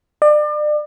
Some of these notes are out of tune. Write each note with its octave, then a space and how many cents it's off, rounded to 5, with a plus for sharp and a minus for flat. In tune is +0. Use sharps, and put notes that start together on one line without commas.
D5 +35